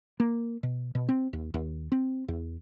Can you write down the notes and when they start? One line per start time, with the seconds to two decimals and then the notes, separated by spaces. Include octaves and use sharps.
0.20 A#3
0.63 B2
0.95 B2
1.09 C4
1.33 D#2
1.54 D#2
1.92 C4
2.28 E2